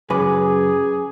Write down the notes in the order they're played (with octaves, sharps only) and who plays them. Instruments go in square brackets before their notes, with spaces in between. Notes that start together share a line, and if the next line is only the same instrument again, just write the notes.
[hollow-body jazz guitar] F#2 C#3 B4 [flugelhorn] G#4 [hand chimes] G#5 D6